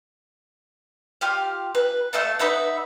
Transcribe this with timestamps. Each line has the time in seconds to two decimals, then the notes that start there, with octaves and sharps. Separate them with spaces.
1.21 F4 G4 F5
1.75 B4
2.13 A3 E5 F5 A5
2.39 D#4 B4 E5 F#5